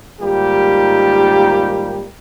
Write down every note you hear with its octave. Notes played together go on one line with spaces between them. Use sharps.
G#2 D#3 G3 A#3 F4 G4